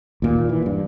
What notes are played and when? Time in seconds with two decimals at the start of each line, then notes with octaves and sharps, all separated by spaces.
0.22 D#2 A#2
0.49 E3
0.66 G2